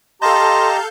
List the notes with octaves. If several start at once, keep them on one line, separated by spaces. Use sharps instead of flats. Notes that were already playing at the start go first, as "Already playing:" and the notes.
G4 A4 D#5 F5 A5 A#5 C6 G6